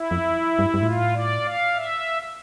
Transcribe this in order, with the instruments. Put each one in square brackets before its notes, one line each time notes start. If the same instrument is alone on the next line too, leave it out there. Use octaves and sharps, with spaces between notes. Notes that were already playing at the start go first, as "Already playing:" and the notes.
Already playing: [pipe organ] E4
[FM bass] F2
G2
G2
[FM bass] A2 [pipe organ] F4
[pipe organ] D5
F5
E5